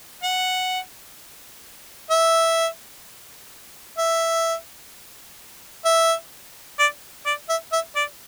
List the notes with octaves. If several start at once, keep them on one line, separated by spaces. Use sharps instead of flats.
F#5
E5
E5
E5
D5
D5
E5
E5
D5